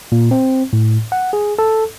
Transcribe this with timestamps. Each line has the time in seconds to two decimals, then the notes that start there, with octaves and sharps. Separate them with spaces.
0.12 A#2
0.31 C4
0.73 A2
1.12 F#5
1.33 G#4
1.59 A4